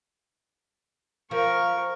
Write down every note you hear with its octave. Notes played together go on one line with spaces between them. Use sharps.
F3 A#4 C#6